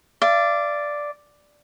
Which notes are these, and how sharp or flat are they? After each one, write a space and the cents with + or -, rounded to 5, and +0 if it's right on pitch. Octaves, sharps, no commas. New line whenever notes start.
D5 +0 F5 -40